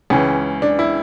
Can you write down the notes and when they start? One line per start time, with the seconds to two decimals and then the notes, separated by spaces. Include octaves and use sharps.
0.10 C#2 C#3 E3 C#4
0.62 D4
0.79 E4